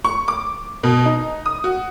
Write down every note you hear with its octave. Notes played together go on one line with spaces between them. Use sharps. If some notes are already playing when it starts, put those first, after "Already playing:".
C#6
D6
B2
D#4
D#6
F#4